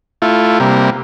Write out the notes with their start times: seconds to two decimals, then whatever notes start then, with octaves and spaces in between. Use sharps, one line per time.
0.22 A3 E4 F4
0.60 C3 G3 A#3